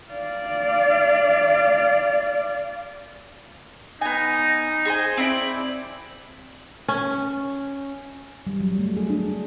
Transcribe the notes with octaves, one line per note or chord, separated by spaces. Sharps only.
D5 F5
B3 D#4 G#5
G#4 C5 G#5
C4 E4 D5
C#4
G3
F#3
A3
G#4
D4